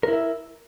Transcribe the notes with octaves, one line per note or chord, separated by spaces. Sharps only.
E4 A#4 E5